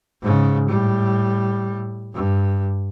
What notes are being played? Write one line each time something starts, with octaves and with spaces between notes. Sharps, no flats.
G#2 C#3
A2 G3
G2